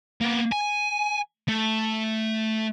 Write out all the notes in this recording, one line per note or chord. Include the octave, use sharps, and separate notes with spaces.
A#3 B3
G#5
A3